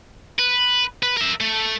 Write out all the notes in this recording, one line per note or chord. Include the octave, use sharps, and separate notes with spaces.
B4
B4
A#4 E5
A3